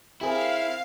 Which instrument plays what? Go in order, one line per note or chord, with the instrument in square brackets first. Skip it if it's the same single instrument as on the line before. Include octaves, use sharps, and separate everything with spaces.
[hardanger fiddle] C4 [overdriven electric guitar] E4 [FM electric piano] G4 G#4 A#4 [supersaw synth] F5